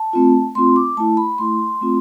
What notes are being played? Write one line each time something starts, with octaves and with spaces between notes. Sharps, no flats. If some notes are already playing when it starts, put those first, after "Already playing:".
Already playing: A5
A3 C4 F4
A3 C4 F4 C6
D6
A3 E4 A5
B5
A3 E4 C6
A3 C4 F4